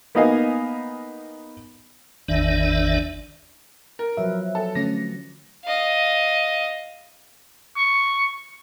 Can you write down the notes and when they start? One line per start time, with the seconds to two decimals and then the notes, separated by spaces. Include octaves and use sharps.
0.15 A#3 B3 D#4 D#5 F5 G#5
2.28 G#1 E2 D#3 D4 D5 E5
3.99 A#4
4.17 F3 F#3 B4 E5
4.55 A4
4.75 D3 A3 C#4 A#6
5.65 D#5 F5
7.77 C#6